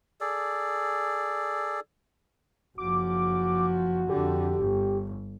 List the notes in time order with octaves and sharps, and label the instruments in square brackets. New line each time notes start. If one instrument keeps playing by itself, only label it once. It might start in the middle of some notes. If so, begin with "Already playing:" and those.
[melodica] G#4 A4 D5
[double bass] F#1 F3 [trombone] F#4 [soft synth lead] D6
[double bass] F2 D3 [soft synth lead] G4
[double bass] G1